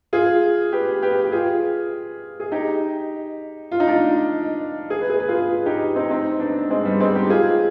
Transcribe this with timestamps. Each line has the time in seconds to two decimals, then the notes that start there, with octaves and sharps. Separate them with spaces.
0.13 F4 G#4
0.72 G4 B4
1.03 G4 B4
1.25 G4
1.32 F4 G#4
2.40 G#4
2.52 D#4 G4
3.71 F4
3.80 D#4
3.87 D4 F4
4.90 G#4
5.01 B4
5.10 G#4
5.19 B4
5.28 F4 G#4
5.66 D#4 G4
5.95 C4 D#4
6.10 C4 D#4
6.40 B3 D4
6.70 G#3 C4
6.85 G3 B3
7.00 G#3 C4
7.15 D#4 G4
7.30 F4 G#4